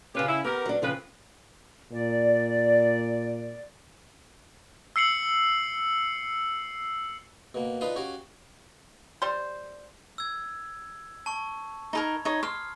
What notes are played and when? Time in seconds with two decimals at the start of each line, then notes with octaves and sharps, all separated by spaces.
0.15 C#3 C#4 F4 G4 B4
0.28 E4
0.45 B3 G4 A#4
0.66 F#3 D4
0.82 C#3 F3 C4 B4
1.92 A#2 D5
4.96 E6 C7 C#7 F#7
7.55 B2 A#3
7.81 D4 D#4 F4 B4 F5 C6
7.96 C#4 F#4 G4 F5
9.22 G3 C5
10.18 E6 G#6
11.26 A5 C#6
11.93 D#4 A4 A#4 A#5 B5 G#6
12.25 D#4 C#5
12.43 C6 D#6 F6